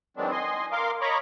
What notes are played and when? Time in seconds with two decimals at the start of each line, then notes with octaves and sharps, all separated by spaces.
0.17 D#3 E3 F#3 G#3 C4 D4
0.31 D#5 G#5 C6
0.72 A#4 F5 C6 D6
1.01 C#5 D#5 A#5 B5 C#6 D6